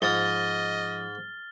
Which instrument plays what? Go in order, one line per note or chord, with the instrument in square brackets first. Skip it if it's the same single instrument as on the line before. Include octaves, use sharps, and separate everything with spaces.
[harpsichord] G#2 D#6 [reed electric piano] F3 [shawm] D#5 [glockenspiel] F6 A6 G7